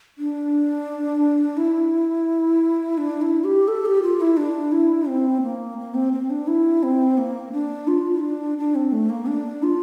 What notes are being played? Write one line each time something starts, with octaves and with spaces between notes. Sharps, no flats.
D4
E4
D4
E4
G4
A4
G4
F4
E4
D4
E4
C4
A#3
A#3
C4
C4
D4
E4
C4
A#3
D4
F4
D4
D4
C4
A3
A#3
D4
F4